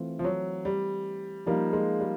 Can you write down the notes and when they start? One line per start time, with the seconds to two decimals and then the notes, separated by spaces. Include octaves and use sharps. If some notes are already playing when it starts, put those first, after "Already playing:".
Already playing: E3 A3 C4 F4
0.19 F3
0.24 F#3
0.65 G3
1.46 F3 G3 A#3 D#4
1.73 G#3
2.00 G3